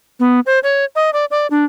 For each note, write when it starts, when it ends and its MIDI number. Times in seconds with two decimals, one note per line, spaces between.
0.20 0.40 59
0.46 0.59 72
0.63 0.85 73
0.96 1.10 75
1.13 1.25 74
1.31 1.47 74
1.51 1.65 62